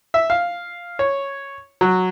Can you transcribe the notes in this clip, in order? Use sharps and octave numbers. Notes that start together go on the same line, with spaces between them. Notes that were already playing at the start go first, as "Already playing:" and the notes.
E5
F5
C#5
F#3